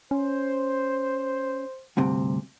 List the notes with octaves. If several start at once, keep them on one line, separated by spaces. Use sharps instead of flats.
C#4 C5
D2 G2 C3